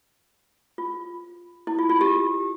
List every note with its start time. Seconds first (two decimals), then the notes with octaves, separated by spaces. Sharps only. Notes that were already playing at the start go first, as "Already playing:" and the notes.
0.78 F4
1.67 E4
1.79 F4
1.90 F4
2.01 G4